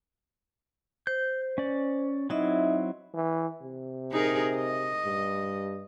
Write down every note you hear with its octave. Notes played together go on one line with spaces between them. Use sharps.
C5 G6
C#4 D5
F#3 C4 D#4 E4 D#5 E5
E3
C3
D#4 G#4 A#4
D#5
G2